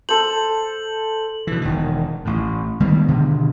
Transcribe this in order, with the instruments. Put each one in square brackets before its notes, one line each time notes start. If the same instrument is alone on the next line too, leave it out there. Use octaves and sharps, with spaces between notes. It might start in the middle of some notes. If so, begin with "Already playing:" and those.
[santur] A4 C5 [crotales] F#7
[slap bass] B2 E3
E1 D#3
A1 A2
D#3 G3 G#3 B3
B2 D3 D#3